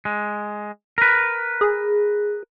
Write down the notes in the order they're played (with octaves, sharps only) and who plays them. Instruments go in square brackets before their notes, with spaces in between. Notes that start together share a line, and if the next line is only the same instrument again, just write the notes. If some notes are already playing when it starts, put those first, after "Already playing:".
[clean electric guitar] G#3
A#4 B4
[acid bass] G#4